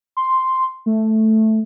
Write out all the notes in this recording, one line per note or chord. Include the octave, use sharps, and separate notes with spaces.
C6
A3